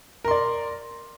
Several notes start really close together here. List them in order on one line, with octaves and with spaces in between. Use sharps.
A#4 C6 D5